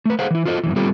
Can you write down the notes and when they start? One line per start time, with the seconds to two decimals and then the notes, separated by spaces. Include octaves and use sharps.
0.05 A3 B4
0.19 G#4 A4 C5 F5 F#5
0.31 E3 E4
0.45 F4 F#4 A4 C5 D#5
0.64 F#2 B2 E3
0.76 G3 C4 F4 G4 A4